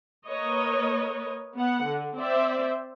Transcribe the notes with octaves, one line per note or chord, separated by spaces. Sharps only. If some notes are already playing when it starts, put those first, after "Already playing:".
A#3 A#4 B4 C#5 D#5
B3 F#5
D3
C4 C5 D5 E5